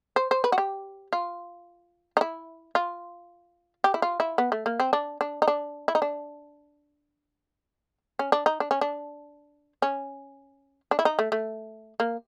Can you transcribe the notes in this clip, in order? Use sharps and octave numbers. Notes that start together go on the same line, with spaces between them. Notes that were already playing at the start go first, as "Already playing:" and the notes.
C5
C5
B4
F#4
G4
F4
D#4
E4
F4
G4
E4
F4
E4
B3
A3
A#3
C4
D4
D4
D#4
D4
E4
D#4
D4
C#4
D4
D#4
D4
C#4
D4
C#4
D4
E4
D#4
A3
A3
A#3